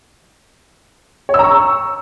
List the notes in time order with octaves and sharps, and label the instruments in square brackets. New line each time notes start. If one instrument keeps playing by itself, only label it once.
[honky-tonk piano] C#5
E6
A#5
C#6